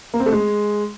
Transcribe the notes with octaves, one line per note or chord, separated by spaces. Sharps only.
A#3
C4
A3
G#3